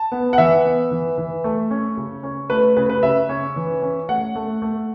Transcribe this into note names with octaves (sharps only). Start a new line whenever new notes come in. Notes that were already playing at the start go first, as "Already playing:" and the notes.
Already playing: A5
B3
F#5
E3 E5
B3
E3
E3
A3
C#4
C#3
C#4
A3 B4
C#3 B4
B4
C#3 E5
C#4
E3
C#4
A3 F#5
A3
A3